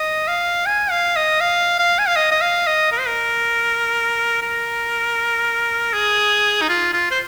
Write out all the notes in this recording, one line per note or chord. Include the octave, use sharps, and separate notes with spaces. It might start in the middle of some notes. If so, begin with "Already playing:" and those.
Already playing: D#5
F5
G#5
F5
D#5
F5
F5
G#5
F5
D#5
D#5
F5
D#5
A#4
C5
A#4
A#4
G#4
D#4
F4
F4
C5